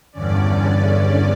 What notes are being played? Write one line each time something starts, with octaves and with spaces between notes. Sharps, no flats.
E2 G2 D3 C#4 D5